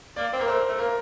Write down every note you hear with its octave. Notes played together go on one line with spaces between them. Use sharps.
A#3 D5
C4
A#3 A#4
A3 C5
A3
A#3 A#4